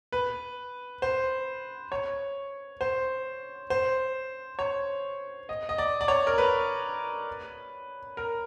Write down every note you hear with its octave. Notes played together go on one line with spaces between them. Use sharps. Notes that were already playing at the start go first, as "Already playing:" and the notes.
B4
C5
C#5
C5
C5
C#5
D#5
D#5
D5
D5
C#5
A#4
B4
A#4